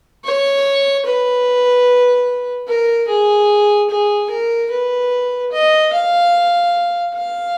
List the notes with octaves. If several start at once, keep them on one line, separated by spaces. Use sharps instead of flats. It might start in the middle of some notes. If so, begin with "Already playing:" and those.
C#5
B4
A#4
G#4
G#4
A#4
B4
D#5
F5
F5